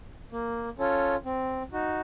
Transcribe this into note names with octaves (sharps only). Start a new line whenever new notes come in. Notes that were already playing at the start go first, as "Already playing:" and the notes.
A#3
C#4 F4 A4 C#5
C4
D#4 F#4